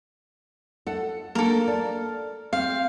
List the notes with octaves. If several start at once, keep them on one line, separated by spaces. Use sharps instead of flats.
A4 F#5
A#3 D4 A4 A#4
D5
C4 F5